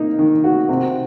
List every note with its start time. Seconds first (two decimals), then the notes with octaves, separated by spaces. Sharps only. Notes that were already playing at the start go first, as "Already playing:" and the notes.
Already playing: A#3 D#4
0.19 D#3
0.44 F#4
0.69 C3